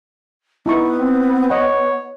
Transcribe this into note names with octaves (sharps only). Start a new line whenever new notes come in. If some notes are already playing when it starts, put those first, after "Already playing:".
B3 D#4 E4 C#6
C4
C#5 D#5 F#5